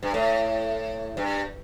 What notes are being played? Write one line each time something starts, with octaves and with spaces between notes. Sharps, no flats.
G2
A2
G2